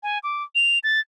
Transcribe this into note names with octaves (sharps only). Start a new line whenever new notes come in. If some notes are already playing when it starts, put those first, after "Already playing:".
G#5
D6
F7
A6